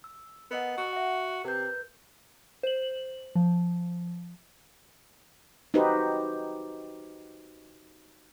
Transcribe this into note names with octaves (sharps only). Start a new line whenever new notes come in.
E6
B3 A#4 D#5 F#5
F#4
E5 F#5
C3 A#4 B4 G6
C5 F#7
F3
D#4 F#4 G4 B4 C5